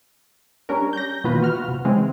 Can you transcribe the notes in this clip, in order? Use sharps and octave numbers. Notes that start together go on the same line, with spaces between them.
G3 C#4 D4 A#4
G6 A#6
B2 D#3 E3 A#3 F4 B4
F#4 F6
C3
C#3 E3 G#3 C4